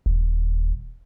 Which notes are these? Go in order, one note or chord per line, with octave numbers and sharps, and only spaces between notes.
D#1